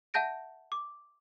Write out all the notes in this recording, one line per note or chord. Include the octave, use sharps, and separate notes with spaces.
E5 F#5 A5 G6 A#6 D7
D6